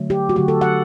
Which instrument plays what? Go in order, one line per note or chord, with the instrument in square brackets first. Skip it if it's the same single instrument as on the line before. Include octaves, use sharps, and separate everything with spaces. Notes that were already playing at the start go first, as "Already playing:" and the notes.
Already playing: [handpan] D3 F#3 A3
G4
F#4
D3 F#3 A3 G4
A4
F#5